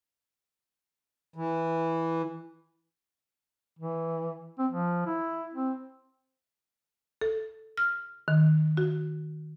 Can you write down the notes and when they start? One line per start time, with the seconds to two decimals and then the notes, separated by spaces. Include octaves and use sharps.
1.36 E3
3.79 E3
4.58 C4
4.72 F3
5.06 E4
5.54 C4
7.21 A4
7.77 F6
8.28 D#3
8.77 F#4